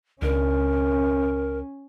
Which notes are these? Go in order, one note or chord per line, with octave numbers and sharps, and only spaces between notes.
C#2 C#4 D4 A#4